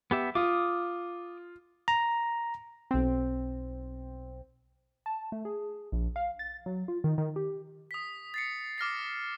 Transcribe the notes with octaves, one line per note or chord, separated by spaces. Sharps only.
B3 G4 E5
F4 D6 D#6
A#5
B1 C4
A5
A3
G#4
A#1
F5
A6
F#3
F4
D#3
D#3
G4
D#6 B6
A6 C7 C#7
D6 F6 A#6 C7